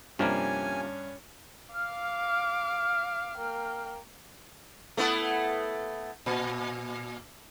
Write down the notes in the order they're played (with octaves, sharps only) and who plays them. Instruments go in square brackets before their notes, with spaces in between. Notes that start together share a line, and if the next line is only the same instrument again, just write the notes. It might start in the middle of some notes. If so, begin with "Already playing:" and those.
[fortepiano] G2 D4 F6 [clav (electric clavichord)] C3 F3 A#3 [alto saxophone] C#4 [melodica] G#5
[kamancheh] F5 D6 [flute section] F6
[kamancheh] A#3 G5
[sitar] A3 B3 E4
A#2